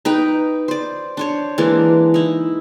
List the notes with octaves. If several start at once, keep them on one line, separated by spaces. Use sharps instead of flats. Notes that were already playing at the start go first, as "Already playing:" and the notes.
D#4 B4 G5
C5 D5
D4 C5 C#5
E3 G#3 A#3 D4
D#4 E4